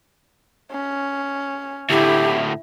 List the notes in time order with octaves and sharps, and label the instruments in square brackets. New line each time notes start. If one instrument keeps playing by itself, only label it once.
[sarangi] C#4
[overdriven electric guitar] D2 A2 [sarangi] E4 [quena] G4